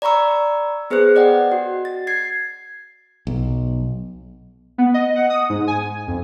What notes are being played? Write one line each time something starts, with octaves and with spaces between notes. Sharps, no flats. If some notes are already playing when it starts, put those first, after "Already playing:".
D5 A#5 B5 C#6 E6
B3 G#4 B4 C5 F#6
D5 D#5 F#5 G5
F#4
A6
G#6 C7
B1
B3
D#5
F#5
D#6
G#2
G#5
F2